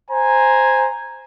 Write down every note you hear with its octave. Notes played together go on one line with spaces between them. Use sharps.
C5 G#5 A#5